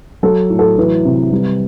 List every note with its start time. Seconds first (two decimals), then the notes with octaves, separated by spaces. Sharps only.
0.23 F#3 A4
0.50 A2
0.59 A4
0.78 E3 B4
1.05 C3
1.31 G3